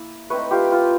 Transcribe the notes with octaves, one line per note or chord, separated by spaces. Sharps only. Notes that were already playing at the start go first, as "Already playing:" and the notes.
Already playing: A#3 E4
A3 C4 D#4 B4 C#5
F4 G4
F4